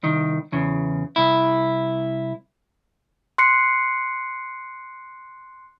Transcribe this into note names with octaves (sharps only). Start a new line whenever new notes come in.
C2 D#3
E2 C#3
C2 E4
C6 F#6 C7 C#7